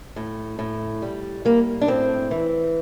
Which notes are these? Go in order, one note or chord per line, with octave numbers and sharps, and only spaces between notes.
A2
A2
G3
G3 A#3
D4
A2 C4
E3